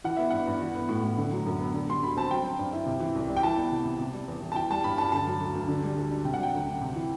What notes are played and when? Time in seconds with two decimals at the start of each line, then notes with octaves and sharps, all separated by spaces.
0.04 E3 F#5
0.17 B3 E5
0.31 G2 F#5
0.47 G2
0.61 E3
0.75 B3
0.89 A2
1.04 A2
1.17 D3
1.32 F#3
1.46 F#2
1.59 B3
1.74 D3
1.88 G3 C6
2.03 D2 B5
2.17 C4 A5
2.31 F#3 G5
2.44 C4
2.59 G2
2.73 E4
2.86 C3
3.00 E3
3.15 C2
3.29 G3
3.37 G5
3.43 E3 A5
3.57 B3
3.72 C3
3.85 C3
3.99 C3
4.14 G3
4.28 E2
4.42 E2
4.52 A5
4.56 E3 G5
4.70 G3 A5
4.84 G2 B5
4.98 G2 A5
5.12 D3 A5
5.27 F#3
5.41 D2
5.55 D2
5.68 D3
5.84 G3
5.97 D2
6.11 D4
6.25 C3 G5
6.34 F#5
6.40 F#3 G5
6.54 D2
6.68 D2
6.81 C3
6.96 E3